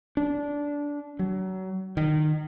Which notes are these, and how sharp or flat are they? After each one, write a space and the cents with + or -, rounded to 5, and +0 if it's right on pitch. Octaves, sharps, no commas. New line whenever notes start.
D4 -15
F#3 +25
D#3 -25